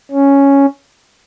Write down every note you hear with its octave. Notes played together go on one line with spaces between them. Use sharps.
C#4